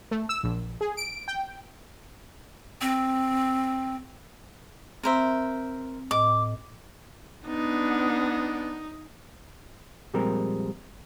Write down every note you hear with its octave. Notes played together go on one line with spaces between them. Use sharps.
A3
E6
A#1
G#4
D7
G5
C4
C4 A#4 C5 E5 A#5
A2 D#5 D6
B3 D4 D#4
A#2 F3 G3 G#3 C4 A#4